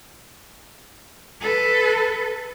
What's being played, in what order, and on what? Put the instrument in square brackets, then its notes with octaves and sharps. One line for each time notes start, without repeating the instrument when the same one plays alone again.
[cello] A4 B4